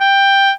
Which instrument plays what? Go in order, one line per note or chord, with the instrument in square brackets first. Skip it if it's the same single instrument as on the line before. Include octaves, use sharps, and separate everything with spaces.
[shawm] G5